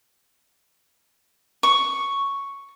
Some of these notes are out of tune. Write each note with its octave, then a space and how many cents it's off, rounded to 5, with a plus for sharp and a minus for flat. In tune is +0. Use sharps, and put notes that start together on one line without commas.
C#6 +0